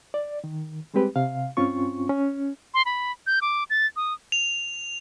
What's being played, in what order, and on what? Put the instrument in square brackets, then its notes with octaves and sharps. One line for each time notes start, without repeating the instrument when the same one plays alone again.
[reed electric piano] D5
D#3
G3 G#3 C4 G4 B4
C3 F5
G2 C4 C#4 F4 C#6
C#4
[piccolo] C6
B5
G6
D6
A6
D#6
[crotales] F7